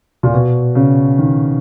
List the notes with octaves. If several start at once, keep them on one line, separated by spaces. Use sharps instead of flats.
A#2
B2
C#3
D#3